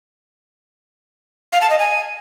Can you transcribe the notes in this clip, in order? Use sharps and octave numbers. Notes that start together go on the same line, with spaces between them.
F5
A5
D#5
G#5